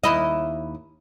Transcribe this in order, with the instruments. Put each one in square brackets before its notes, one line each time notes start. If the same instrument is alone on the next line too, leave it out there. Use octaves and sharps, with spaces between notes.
[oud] D#2 E4 D#5